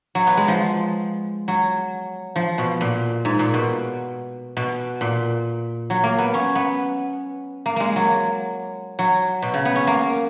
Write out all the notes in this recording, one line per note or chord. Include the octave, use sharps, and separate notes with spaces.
F#3
B3
G#3
F3
F#3
F3
B2
A#2
G#2
A#2
B2
B2
A#2
F#3
A#3
B3
C#4
B3
A#3
G#3 A#3
F#3
F#3
B2
C#3
B3
C#4
A#3